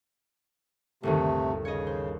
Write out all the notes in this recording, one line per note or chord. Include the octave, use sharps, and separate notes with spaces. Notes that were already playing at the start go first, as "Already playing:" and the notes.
G1 D#2 C3 D#3 A3
C#3 C#5 D#5
C5